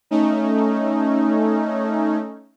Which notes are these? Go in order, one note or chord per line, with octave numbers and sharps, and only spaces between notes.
A3 C#4 D#4